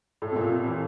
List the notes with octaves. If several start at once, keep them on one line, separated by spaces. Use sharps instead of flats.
A2
C3
A#2
C3
E3